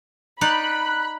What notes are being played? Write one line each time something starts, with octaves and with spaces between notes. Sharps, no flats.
D#4 D5 A#5 B5 F#6